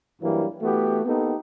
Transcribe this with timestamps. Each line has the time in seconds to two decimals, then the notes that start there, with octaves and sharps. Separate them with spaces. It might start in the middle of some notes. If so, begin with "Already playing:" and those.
0.22 G2 E3 F#3 G3 A#3
0.61 E3 A3 B3 F#4 G4
1.06 A#3 B3 D#4 G4 A4